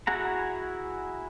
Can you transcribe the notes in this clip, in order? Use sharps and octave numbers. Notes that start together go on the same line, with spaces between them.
E4 F#4 G#4 F#5 A#5